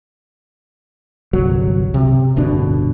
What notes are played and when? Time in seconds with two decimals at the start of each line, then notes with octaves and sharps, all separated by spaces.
1.33 G1 C2 F#3
1.94 C3
2.36 D1 G1 B2 D4